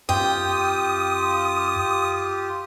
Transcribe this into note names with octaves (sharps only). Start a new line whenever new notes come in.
F#2 F4 G4 G5 D#6